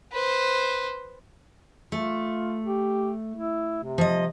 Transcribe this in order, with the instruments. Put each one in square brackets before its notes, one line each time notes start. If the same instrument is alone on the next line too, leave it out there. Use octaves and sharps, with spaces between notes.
[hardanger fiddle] B4 C5
[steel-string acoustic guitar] A3 [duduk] F4
[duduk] G4
E4
C3
[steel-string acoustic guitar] F3 D#5